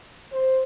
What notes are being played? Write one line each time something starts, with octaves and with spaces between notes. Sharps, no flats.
C5